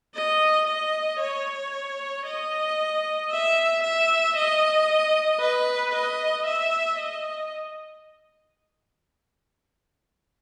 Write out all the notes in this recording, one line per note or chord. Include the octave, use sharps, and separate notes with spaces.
D#5
D#5
C#5
D#5
E5
E5
D#5
B4
D#5
E5
D#5